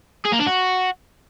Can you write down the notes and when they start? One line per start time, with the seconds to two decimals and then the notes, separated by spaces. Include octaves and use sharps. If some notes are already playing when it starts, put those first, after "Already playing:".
0.25 G#4
0.32 A#3
0.39 D4
0.46 F#4